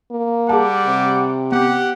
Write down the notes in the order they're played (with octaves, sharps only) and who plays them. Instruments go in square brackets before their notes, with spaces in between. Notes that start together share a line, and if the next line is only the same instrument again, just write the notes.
[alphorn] A#3
[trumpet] G3 [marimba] G#4 A5 [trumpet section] F#5 D6
[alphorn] C3
[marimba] B3 [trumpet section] G4 [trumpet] F#5